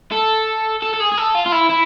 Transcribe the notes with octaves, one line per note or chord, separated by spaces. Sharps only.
A4
A4
A4
G#4
G#4
A4
F4
F4
E4
E4